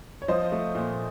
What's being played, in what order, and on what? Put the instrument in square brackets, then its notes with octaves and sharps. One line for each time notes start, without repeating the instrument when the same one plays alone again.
[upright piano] C#5
[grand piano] F3 [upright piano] C5 D#5
[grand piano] A3
A#2